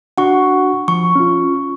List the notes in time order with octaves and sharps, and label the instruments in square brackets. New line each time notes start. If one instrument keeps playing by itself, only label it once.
[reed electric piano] D4 F#4 [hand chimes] F#5 C#6
[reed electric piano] F3 [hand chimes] C#6
[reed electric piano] C#4 F4